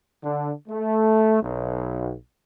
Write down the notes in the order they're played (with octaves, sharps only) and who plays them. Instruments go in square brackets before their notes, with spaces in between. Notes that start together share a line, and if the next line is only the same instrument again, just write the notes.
[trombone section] D3
A3
B1